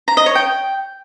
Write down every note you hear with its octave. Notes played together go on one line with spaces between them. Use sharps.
A#5
D#5
C#5
G5